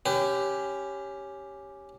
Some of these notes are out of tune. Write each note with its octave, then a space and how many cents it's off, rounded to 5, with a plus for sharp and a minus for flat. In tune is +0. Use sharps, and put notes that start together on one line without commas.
C#4 +0 G4 +0 B4 +40